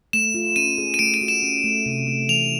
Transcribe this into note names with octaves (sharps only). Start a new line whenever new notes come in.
A3 E7
F4
C#4 D#7
G#4
D#7
A3 D7
D#7
F#4
E7
C#4
A3
C3
A3
E3 F7